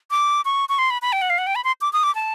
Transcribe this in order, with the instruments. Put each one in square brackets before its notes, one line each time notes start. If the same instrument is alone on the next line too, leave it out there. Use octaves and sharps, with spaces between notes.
[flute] D6
C#6
C#6
C6
B5
B5
G5
F#5
F5
F#5
G5
B5
C6
D6
D#6
D6
A5